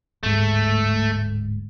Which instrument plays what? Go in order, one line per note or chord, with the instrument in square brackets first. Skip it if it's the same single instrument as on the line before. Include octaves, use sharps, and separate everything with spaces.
[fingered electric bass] D1 G#2 [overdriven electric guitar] A3